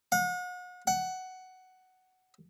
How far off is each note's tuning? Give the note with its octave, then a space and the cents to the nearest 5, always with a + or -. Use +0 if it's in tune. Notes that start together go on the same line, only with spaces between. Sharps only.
F#5 -40
F#5 +10